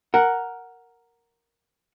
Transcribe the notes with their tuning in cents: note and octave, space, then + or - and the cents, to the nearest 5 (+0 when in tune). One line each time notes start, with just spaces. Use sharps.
A#4 +0 F#5 +0